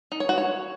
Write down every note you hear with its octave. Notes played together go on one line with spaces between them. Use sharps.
D#4
C#5
F#4
C#5